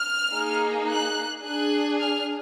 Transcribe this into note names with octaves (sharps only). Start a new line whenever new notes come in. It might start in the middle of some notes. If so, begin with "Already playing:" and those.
Already playing: F6
A#3 D#4 G#4
F#6
D4 G#4 F#6
F6